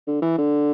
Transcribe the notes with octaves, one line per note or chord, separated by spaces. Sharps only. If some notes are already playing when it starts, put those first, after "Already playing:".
D3
E3
D3